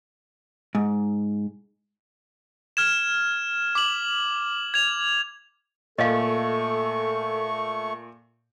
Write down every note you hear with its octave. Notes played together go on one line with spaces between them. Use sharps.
G#2
F6 G#6 E7
D6 F#7
G#6 F7
A#2 A3 A4 D#5 F5 C#6